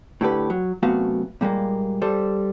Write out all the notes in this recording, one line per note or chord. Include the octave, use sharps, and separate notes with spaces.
A2 D3 G4 B4
F#3
F#2 C3 A3 B3 F#4 F5
A#2 G3 G#3 A#3
G3 A4 C5